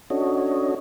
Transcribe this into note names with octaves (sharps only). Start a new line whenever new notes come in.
C#4 D4 F#4 A4 C#5 D#5